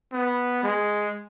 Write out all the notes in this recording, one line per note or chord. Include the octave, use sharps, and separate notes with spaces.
B3
G#3